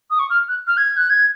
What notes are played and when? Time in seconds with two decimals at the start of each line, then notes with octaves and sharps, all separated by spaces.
0.10 D#6
0.19 C#6
0.30 F6
0.48 F#6
0.67 F6
0.77 G#6
0.97 F#6
1.10 G#6